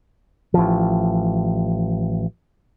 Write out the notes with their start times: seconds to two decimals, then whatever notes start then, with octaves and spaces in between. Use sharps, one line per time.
0.54 A1 F3